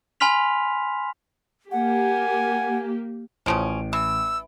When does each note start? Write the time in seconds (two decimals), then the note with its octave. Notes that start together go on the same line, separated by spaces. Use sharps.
0.20 G#5 B5 C6 F6 B6 F7
1.71 A#3 G4 F#5 G#5
3.46 A1 C#3 F3 C#4 D7
3.93 E3 E6